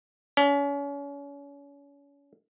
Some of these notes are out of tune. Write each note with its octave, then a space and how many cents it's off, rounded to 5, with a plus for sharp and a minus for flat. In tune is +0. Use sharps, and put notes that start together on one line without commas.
C#4 +35